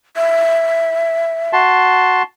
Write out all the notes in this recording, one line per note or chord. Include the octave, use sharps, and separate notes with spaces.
E5
F#4 A5 C6